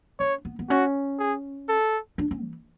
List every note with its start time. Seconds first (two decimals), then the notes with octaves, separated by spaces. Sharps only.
0.19 C#4 C#5
0.45 B3
0.59 B3
0.69 C#4 F#4
1.19 G#4
1.69 A4
2.18 D4
2.31 C#4
2.43 E3